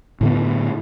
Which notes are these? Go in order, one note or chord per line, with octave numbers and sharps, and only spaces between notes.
A2 D3 B3